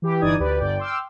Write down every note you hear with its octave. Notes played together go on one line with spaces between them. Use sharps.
E3 G4
G1 E3 D#4 D5 D#6 G#6
D2 G4 B4 D5
G1 D5 G5
G5 C6 D6 E6 F6